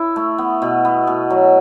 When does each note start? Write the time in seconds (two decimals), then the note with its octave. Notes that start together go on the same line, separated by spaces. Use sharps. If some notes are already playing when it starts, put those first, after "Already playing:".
Already playing: E4
0.16 A3
0.38 B3
0.62 B2
0.85 B3
1.07 B2
1.30 F#3